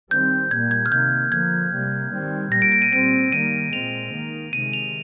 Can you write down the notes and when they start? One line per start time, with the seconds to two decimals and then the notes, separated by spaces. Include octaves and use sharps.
0.11 D#3 G3 C4 G6
0.51 A#2 G3 A#3 G#6
0.71 G#6
0.86 F6
0.92 C3 D#3 A#3 G6
1.31 D3 F3 A#3 G#6
1.71 C3 G3 A#3
2.12 D#3 G3 C4
2.52 A#2 G3 A#3 A#6
2.62 D7
2.72 D7
2.82 D#7
2.92 A#2 G3 C4 D7
3.32 D#3 G3 A#3 D#7
3.72 A#2 G#3 C4 F7
4.13 D#3 A#3
4.53 C3 D#3 G#3 D#7
4.73 F7